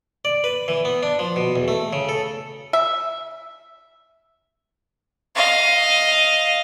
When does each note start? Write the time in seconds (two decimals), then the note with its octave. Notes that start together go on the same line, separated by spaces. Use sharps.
0.25 D5
0.44 B4
0.68 E3
0.85 B3
1.03 D4
1.19 F3
1.36 B2
1.56 E2
1.68 A3
1.93 C#3
2.09 A4
2.73 E5
5.36 D#5 F5